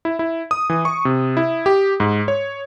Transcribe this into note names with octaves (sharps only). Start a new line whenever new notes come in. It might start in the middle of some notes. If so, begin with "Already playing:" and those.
E4
E4
D#6
E3
C#6
C3
E4
G4
G#2
C#5